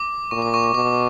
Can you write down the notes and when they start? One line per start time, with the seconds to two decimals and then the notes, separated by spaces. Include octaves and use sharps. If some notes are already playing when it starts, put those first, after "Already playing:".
Already playing: D6
0.31 A#2 C#6
0.42 D6
0.54 C#6
0.64 D6
0.74 B2 D6